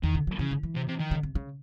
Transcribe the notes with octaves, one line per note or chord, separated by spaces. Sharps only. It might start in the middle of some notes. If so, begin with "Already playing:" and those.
E2 D#3
C#3
F#3
C#3 E3
D#3
E3
C3
C3
D#3
C#3
C3
C#3